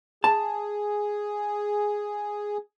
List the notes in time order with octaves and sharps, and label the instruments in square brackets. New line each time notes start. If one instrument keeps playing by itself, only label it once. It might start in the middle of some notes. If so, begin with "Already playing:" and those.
[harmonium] G#4 [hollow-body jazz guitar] A5